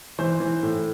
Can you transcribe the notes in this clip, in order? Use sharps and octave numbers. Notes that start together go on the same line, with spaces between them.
E3 C5
E3
A2